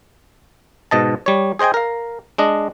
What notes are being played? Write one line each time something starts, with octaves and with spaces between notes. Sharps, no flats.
G#2 B2 D#5 A5
G3 C#5
G#4 C5 D#5 G5 G#5
A#4 F5
G#3 D4 D#5